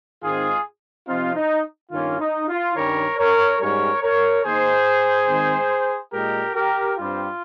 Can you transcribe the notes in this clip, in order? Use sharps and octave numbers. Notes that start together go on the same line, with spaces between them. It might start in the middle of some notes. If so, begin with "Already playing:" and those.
G#2 D#3 G#3 C4 F4 G#4
C3 F3 C4 D#4 F4
D#4
G2 D#3 A#3 C#4 F4
D#4
F4
G2 D#3 G3 C#4 A#4 C#5
A#4 C#5
G#2 G3 C#4 A#4 C#5
A#4 C#5
D#3 A#3 D#4 G#4 C5
D#3 G#3 C4
A#2 G#3 D#4 G4 A#4
G4 A#4
G2 G3 C4 F4